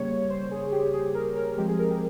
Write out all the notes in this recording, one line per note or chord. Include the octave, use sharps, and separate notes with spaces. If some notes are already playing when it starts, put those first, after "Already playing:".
Already playing: C#3 G3 A#3 C#5
C5
G#4
G4
G#4
A#4
A#4
F3 G#3 C4 G4
G#4
A#4
G4